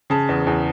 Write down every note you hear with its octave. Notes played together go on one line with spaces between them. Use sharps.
C#3 A5
E2
E2